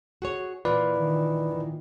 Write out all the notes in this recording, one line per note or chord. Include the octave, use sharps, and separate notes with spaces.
F#4 G#4 C#5
A#2 E3 F4 B4 D5
D#3